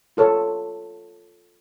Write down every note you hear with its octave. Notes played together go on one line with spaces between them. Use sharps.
F4 A4 C#5